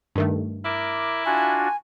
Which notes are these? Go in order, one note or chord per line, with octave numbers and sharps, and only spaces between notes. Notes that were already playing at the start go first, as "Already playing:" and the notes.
G2 D#3 A3
E4 A#4 D6
D4 F4 F#4 G#5